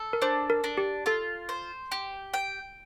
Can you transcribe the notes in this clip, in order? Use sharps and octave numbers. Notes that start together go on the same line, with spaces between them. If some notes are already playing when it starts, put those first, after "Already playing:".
Already playing: A4
A#4
D4 C5
A#4
D4
G4
F4 A4
C5
G4
G5